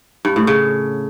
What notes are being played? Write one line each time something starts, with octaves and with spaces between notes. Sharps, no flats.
G2
A2
C#3